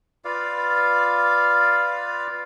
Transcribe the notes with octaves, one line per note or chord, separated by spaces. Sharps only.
F4 B4 D5 F5